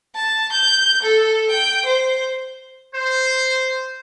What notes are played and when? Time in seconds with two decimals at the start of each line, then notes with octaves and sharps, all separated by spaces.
0.15 A5
0.52 G6
1.03 A4
1.50 G5
1.86 C5
2.95 C5